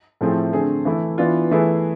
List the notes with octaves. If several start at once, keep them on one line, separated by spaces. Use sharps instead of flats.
A2 F3 A3 C4 G#4
D3 A3 C4 G#4
E3 A3 E4
E3 B3 D4 F4
E3 A3 E4 G#4 B4